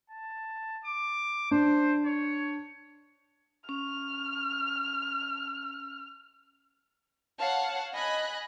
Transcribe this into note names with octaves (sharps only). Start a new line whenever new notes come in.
A5
D6
D4 C5
C#5
C#4 F6
C#5 F5 F#5 A5
D#5 G#5 B5 F#6